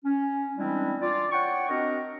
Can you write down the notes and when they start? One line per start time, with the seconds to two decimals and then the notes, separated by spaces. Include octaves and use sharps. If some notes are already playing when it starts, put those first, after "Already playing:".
0.05 C#4
0.57 E3 G3 G#3 C4 D4 E4
1.01 F4 D5
1.32 C#5 F#5 G5 C#6
1.68 C4 D4 F#4 A#4 D#5